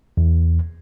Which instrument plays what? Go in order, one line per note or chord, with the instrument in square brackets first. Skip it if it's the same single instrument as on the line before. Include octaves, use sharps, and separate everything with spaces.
[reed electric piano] E2